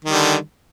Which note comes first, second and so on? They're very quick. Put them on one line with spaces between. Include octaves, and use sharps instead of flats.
D#3 G3 D3